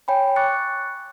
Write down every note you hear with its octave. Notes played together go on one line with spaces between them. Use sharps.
C#5 G5 G#5 B5
C#6 D6 F#6 A6 C#7